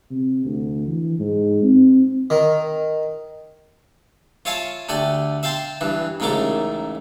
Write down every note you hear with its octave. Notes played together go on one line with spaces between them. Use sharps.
C3
D2
E3
G#2
C4
D#3
F4 C#5 E5 F5 G#5 A5
D2 A3 G4 D5 G#5
E5 F5 G5 A5 C6
G2 E3
A1 G#2 C#3 A3 A#4 D6